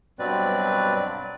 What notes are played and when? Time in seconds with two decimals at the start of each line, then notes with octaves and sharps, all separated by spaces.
0.19 G2 B2 F#3 C4 B4 D5